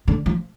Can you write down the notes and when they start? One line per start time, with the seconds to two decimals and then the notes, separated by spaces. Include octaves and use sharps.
0.08 D3
0.26 F3